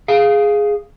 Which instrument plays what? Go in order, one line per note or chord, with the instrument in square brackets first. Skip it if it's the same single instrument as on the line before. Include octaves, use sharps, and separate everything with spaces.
[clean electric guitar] G#4 F5